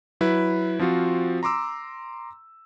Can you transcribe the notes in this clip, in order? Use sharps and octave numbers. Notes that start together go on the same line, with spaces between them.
F#3 E4 B4
F3 C4 F4 F#4
A#5 C6 D6 E6